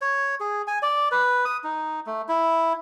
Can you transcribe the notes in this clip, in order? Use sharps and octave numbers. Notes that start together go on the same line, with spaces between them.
C#5
G#4
G#5
D5
B4
D#6
D#4
A3
E4